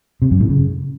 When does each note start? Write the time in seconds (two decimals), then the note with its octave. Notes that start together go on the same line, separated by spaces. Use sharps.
0.22 C3
0.31 F#2
0.40 A2
0.50 C#3